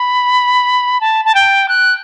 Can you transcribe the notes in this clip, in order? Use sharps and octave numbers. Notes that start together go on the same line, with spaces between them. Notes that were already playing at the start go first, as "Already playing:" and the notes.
Already playing: B5
A5
A5
G5
F#6